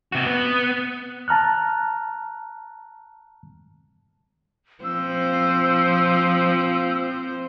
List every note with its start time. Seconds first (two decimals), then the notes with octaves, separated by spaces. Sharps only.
0.12 C3 F#4
0.27 B3
1.28 A5 A#5 F6 F#6
4.84 F3 C4 C5 E6